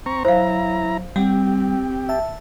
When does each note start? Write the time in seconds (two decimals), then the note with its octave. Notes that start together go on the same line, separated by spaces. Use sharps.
0.06 C4 A#5 C#6
0.25 F#3 E4 C5 F5 A#5
1.16 G3 C4 G4 F#5
2.09 E5 A5